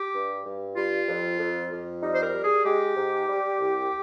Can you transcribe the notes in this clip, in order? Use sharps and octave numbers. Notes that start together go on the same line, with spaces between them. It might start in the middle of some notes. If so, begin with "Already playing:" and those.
Already playing: G4
G2
G2
G3 F4
F2
F2
F2
G3 D#4
C5
A#4
G3
G#4
G#3 G4
G#2
G3
C2